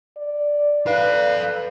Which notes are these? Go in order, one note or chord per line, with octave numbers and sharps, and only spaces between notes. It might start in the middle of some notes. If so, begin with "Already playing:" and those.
D5
A4 B4 F5